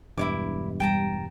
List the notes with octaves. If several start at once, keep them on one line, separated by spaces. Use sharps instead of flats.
E1 G2 E4 C#5 D6
G3 G5 A5 A#5